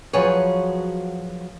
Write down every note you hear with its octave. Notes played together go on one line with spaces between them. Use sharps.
F3 F#3 F#4 G#4 B4 C#5